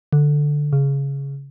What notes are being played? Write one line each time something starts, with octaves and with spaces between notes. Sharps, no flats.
D3
C#3